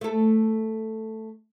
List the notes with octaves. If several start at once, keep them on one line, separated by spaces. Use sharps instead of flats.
A3 A4